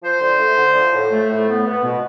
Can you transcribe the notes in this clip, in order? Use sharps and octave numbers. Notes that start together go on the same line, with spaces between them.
F3 C5
D3
A3
D3
F3
A2
A3
A2
B3
B3
B2